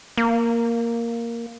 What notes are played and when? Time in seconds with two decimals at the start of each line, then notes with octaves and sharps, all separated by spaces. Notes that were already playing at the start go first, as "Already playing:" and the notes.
0.17 A#3